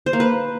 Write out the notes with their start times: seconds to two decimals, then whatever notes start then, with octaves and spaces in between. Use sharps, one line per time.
0.06 C5
0.13 A#3
0.20 B4